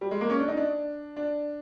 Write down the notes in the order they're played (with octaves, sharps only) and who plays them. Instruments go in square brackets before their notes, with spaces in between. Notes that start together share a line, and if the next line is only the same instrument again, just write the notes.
[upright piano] G3
G#3
A#3
C#4
D4
D#4
D4
D4